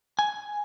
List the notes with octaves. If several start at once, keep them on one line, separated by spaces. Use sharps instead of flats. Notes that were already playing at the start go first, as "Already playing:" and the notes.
G#5